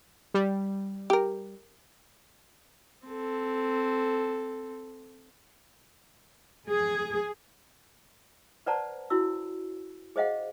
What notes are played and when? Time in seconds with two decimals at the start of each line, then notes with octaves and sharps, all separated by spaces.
0.34 G3
1.10 G4 A#4
3.07 C4 A4
6.68 G#4
8.66 B4 C5 D5 F#5 A5 A#5
9.10 E4 F#4 E6
10.16 G#4 C5 D#5 F5 F#5